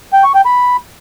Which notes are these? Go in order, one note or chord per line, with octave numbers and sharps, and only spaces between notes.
G5
C#6
G5
B5